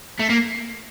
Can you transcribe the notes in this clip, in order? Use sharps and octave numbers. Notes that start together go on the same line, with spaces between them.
A3
A#3